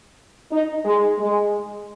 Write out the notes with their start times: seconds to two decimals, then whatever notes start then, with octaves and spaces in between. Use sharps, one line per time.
0.51 D#4
0.84 G#3
1.18 G#3